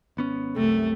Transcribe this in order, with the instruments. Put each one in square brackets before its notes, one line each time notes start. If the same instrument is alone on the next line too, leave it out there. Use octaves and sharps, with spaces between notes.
[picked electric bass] G#1 B3 C#4
[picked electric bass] C2 F#2 C3 [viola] A3